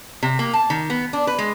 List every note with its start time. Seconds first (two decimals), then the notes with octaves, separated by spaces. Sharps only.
0.23 C3
0.39 A#3
0.53 A5
0.70 D#3
0.90 B3
1.13 D4
1.27 B4
1.39 G#3